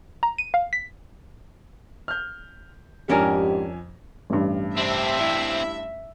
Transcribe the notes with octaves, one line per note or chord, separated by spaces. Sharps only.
A#5
D#7
F5
B6
F6 G6
F2 G#2 C#4 D4 G4 A#4 G#5 F6
A1 G2
C3 C4 D4 E5
E4